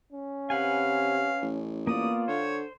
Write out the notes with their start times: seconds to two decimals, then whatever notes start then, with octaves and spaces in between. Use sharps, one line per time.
0.13 C#4
0.50 C3 B4 F5 F#5 G#5
1.42 A1
1.87 A#3 B3 F4 D5 D#6
2.28 D3 C5 C#5